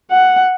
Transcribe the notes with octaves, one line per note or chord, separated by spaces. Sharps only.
F#5